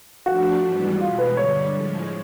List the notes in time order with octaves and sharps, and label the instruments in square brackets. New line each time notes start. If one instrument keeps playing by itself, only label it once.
[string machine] F3 A3 D4 [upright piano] F#4
[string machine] G#2 E3 G3 B3
[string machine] E2 B2 G#3 [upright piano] F4
[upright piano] B4
[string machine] G2 D3 G3 [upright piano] C#5
[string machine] A2 F3 G#3